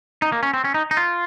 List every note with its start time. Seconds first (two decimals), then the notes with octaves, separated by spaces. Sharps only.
0.22 D#4
0.32 A#3
0.43 C#4
0.54 C4
0.64 C#4
0.74 D#4
0.91 D#4
0.97 F4